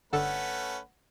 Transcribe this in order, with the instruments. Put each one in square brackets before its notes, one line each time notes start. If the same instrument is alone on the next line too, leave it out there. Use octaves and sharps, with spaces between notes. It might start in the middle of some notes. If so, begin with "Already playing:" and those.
[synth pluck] G1 D3 A4 [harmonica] A3 C#4 B4 [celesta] F#5